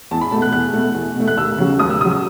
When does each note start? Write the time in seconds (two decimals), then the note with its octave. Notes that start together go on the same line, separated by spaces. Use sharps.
0.11 E2 A5
0.21 B5
0.31 B2 A3 A5
0.42 F#6
0.52 E2 F#6
0.74 B2 A3
0.95 E2
1.16 B2 A3
1.27 F#6
1.37 D#2 E6
1.58 C#3 F#3
1.79 D#2 D#6
1.90 E6
2.01 C#3 D#6
2.05 F#3
2.11 D#6